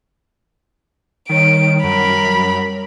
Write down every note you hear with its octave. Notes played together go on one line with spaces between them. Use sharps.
D#3 G3 C#5 D7
F#2 A#4 B5